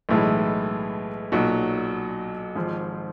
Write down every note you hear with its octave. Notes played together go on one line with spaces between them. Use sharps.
B1 A2 E3 G#3
B1 A#2 F#3
G#1 G#2 F3